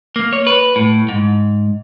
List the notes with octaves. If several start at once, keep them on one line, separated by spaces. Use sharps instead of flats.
A#3
C#5
B4
A2
G#2